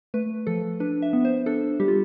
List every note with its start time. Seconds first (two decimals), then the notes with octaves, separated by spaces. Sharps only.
0.14 A3 B4
0.47 F3 A4
0.80 D4 B4
1.02 E5
1.13 B3
1.25 C5
1.46 D4 A4
1.80 G3 G4
1.88 F4